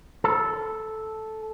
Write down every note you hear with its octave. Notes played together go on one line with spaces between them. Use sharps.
A4